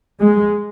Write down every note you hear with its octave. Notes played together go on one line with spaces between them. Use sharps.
G#3